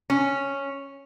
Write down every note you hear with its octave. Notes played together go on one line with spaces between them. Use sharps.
C#4